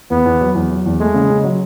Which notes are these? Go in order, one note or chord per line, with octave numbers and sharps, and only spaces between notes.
E2 B3
E2
F#3
E2
F#3
E2
G#3 A3
C#3
C#3
F#3